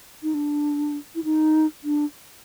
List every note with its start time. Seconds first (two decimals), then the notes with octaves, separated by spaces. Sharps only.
0.23 D#4
0.34 D4
1.15 E4
1.24 D#4
1.84 D4